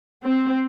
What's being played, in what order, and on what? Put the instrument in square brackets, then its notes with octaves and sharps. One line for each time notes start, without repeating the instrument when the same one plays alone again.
[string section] C4